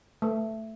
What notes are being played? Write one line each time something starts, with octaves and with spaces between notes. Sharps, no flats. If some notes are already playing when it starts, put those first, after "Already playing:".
A3